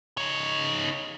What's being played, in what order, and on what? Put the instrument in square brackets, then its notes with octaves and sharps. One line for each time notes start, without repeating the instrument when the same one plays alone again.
[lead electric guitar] D#4 C#5